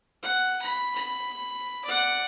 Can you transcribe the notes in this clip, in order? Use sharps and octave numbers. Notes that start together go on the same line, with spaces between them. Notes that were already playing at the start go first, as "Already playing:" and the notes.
F#5
B5
B5
D5 F#5